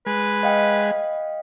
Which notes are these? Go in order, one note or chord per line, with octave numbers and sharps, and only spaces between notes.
G#3 B4
D#5 F5 G5